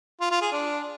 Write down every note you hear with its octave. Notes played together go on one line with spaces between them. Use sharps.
F4
F4
G#4
D4